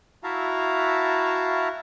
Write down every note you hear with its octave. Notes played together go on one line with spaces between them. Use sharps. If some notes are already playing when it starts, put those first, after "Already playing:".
E4 F#4 E5 F5 A5 A#5